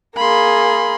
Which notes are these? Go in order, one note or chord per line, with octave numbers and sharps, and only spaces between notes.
A#3 G#4 B5 C6